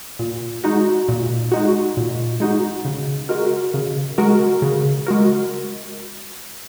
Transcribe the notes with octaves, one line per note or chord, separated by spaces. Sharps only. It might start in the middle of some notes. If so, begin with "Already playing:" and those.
A#2
G#3 D#4 F#4
A#2
G#3 D#4 F#4
A#2
G#3 D#4 F#4
C#3
G#3 F#4 A#4
C#3
G#3 F#4 A#4
C#3
G#3 F#4 A#4